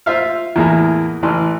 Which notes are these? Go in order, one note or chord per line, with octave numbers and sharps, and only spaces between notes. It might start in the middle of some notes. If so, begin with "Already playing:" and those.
F4 C5 E5 F5
E2 A2 A#3 E4 G#4 A#5
A1 E3 C6